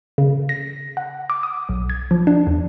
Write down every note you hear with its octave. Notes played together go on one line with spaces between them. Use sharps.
C#3
A#6
F#5
D6
D#6
B1
G#6
F3
D4
E2